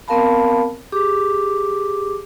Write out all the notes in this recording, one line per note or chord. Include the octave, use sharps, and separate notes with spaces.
B3 C4 A#4 F5 A5 B5
G4 G#4 D6